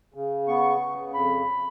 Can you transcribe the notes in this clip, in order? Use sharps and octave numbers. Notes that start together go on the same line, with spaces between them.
C#3
B3 C#6
C#3
F2 B5